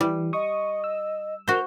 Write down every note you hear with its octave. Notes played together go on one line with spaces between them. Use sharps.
E3 G3
D#5 C#6 D#6
E6
F#4 A#4 C5 G6